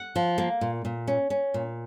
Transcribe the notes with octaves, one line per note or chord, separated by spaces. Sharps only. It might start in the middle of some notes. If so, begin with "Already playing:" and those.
Already playing: F#5
F3
A#3
A#2
A#2
C#4
C#4
A#2